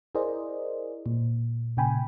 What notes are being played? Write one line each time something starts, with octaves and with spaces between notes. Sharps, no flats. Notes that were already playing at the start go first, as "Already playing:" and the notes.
E4 G#4 A#4 C5 D5 D#5
A#2
A#2 C#3 G5 G#5 B5